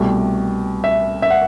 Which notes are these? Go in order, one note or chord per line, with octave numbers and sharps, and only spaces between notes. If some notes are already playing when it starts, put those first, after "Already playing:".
Already playing: C2 B2 A3 G4
E5
E5
F#5